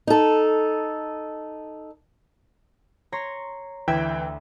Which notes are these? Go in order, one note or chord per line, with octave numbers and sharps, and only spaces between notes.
D#4 A4
C#5 A#5 C6
D2 E3 E5 G5 G#6